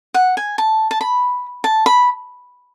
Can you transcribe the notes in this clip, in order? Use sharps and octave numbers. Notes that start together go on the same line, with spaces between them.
F#5
G#5
A5
A5
B5
A5
B5